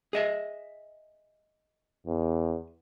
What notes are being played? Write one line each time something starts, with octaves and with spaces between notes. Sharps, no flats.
G#4 D#5 E5
E2